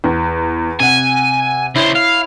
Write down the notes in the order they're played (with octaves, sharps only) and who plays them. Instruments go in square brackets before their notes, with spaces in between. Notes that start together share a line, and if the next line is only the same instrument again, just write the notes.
[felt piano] E2
[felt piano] C3 F#5 [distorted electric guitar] G#5
[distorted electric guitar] C#2 C5 [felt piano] E4 C#5
[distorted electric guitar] F5